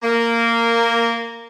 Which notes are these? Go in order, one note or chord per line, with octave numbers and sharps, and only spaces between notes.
A#3